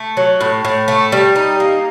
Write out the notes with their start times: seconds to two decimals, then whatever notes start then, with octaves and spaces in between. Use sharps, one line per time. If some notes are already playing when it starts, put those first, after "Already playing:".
Already playing: A3
0.17 F#3
0.41 A2
0.65 A2
0.88 A3
1.12 G3
1.36 D#4
1.60 A#3